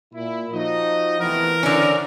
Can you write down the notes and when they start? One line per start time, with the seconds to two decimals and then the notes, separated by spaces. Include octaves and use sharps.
0.14 A#2 E4
0.53 F3 D#4 F#4 D#5
1.20 C3 E3 A3 B3 A#4
1.63 D3 C#4 E4 C5 D5